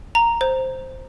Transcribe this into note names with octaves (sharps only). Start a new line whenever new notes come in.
A#5
C5